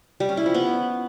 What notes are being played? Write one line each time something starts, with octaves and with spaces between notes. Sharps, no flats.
G3
C#4
E4
F3
B3